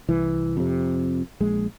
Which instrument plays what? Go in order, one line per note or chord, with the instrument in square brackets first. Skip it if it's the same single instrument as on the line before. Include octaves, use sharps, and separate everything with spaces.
[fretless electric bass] C2 E3
F2 C3
A#1 G#3